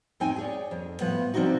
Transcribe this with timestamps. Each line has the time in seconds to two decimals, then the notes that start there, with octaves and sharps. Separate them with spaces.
0.20 F2 A2 C4 D#4 G5 G#5
0.36 G#4 C#5 D5
0.71 F2
1.01 A2 F3 B3 F#5
1.34 C3 F3 C4 D4 D#4 F#4